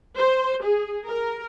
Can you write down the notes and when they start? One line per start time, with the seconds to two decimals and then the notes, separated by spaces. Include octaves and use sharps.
0.17 C5
0.63 G#4
1.06 A#4